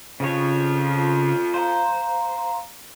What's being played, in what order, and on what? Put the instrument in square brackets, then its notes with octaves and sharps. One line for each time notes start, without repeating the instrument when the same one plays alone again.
[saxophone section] F2 F3 [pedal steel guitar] C#3 C#5
[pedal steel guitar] C5 [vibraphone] F5 A#5